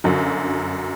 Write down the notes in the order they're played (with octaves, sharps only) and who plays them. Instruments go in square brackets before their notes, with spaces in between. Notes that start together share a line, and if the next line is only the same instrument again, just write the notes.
[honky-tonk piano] G1 F#2 D3 F#3